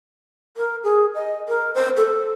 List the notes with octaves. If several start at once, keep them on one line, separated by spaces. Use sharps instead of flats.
A#4
G#4
D#5
A#4
C5
A4